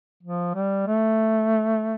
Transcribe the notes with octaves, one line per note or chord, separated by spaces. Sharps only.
F3
G3
A3